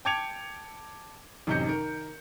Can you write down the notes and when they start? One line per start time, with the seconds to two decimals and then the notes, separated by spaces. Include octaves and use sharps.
0.05 G5 A5 D6 G#6 C#7 F7
1.47 A1 F#2 C3 D#4 G6 C#7
1.66 D#3 A#4